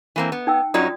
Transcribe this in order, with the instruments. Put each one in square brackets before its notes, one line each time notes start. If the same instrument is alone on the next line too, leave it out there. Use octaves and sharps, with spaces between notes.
[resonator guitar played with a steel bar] E3 A#3 C4
B3
[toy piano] D#4 G5 E6
[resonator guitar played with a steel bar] F#2 F#3 D#4 [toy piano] F4 D5 D#6